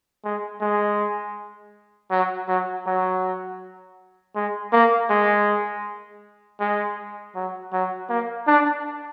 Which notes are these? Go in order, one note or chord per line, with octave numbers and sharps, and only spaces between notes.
G#3
G#3
F#3
F#3
F#3
G#3
A#3
G#3
G#3
F#3
F#3
A#3
D4